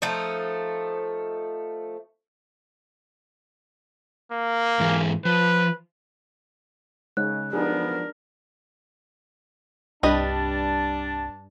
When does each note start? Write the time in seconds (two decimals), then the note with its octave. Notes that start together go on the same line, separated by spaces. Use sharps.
0.02 F3 A3 D#4
4.32 A#3
4.80 G#2 E3 G#4
5.25 F3 B4
7.17 C#3 G#3 D#4 C#5 F#6
7.53 F3 F#3 B3 D4 D#4 G4 G#4 A#4
10.03 C2 G2 G3 D4 B4 D#5 A5